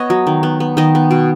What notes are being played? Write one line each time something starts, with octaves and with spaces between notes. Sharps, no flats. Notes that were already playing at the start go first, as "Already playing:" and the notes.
Already playing: B3 C#5 D#5
F#3
D#3
B3
B3
D#3 D#5
B3
B2